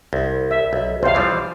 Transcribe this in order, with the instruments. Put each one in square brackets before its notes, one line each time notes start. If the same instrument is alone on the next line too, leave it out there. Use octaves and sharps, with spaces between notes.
[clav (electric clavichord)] C2
[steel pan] E5
[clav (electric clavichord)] B1
[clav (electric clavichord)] B1 E2 [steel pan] C5 F5
[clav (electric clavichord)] E3 F3 G3